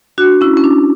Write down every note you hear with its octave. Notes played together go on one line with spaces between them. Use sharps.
D4 F#4
C#4 E4
C#4
D4